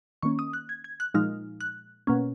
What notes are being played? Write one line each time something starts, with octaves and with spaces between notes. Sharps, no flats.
D#3 A#3 C#4 C#6
D#6
F#6
G#6
G#6
F#6
A#2 F3 G#3 D#4 F6
F#6
B2 A#3 C#4